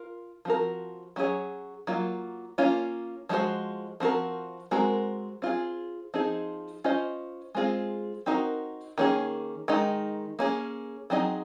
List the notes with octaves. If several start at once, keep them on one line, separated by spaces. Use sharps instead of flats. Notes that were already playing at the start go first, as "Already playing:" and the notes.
Already playing: F4 A#4
F3 C4 F#4 A#4
F#3 C#4 F4 G#4 C#5
F#3 A#3 F4
A#3 C#4 F4
F3 G#3 C#4 F#4 C5
F3 C4 F#4 A#4
G#3 C4 F#4 A#4
C4 F4 G#4
F3 C4 D#4 G#4
C#4 F4 C5 D#5
G#3 C4 F4 G#4
C4 D#4 F#4 A#4
D#3 A#3 C#4 G#4
D#3 G#3 D#4
A#3 C#4 G#4
F#3 C4 D#4 G#4 D#5